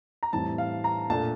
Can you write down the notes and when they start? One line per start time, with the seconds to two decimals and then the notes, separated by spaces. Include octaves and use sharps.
0.23 A#5
0.33 A2 E3 G3 C4 A5
0.58 F5
0.84 A#5
1.10 A#2 A3 D4 A5